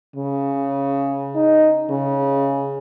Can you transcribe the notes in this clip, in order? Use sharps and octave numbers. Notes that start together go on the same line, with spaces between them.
C#3
D#4
C#3